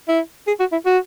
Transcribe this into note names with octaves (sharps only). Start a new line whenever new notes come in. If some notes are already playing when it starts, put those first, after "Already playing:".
E4
G#4
F#4
E4
F#4